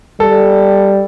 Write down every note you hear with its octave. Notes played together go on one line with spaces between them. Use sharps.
G3 A4